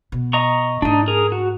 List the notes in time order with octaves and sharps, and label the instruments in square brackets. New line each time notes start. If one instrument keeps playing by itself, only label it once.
[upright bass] B2
[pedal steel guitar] D#5 A#5 C#6
[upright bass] G#2 A3 [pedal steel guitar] D4 D#4
[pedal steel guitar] G#4 A#4
F#4